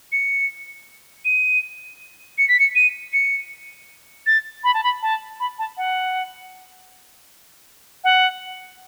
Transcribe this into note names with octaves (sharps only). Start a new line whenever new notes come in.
C#7
D#7
C#7
B6
C#7
D#7
C#7
A6
B5
A5
B5
A5
B5
A5
F#5
F#5